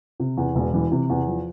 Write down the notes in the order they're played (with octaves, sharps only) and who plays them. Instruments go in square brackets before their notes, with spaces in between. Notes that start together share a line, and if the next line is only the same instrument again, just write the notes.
[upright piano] C3
E2
E1
E3
C3
E2
F3